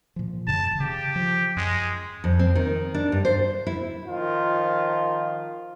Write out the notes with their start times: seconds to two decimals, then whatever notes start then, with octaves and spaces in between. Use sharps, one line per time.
0.16 A#2 F3
0.47 D#1 F#2 C#3 A5
0.80 C#3 G4
1.16 F3
1.57 F#2 G#3
2.24 F2
2.39 C4
2.55 D#3
2.94 D4
3.12 G2
3.25 C5
3.67 E4
4.07 D#3 F3 F4